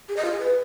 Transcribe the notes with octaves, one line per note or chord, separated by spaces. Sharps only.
G#4
D#5
F4
G#4
B4